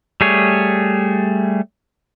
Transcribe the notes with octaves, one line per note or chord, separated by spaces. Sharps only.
G3 A3 G#4 C#5